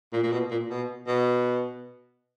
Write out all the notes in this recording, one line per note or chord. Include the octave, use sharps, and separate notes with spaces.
A#2
A#2
B2
A#2
B2
B2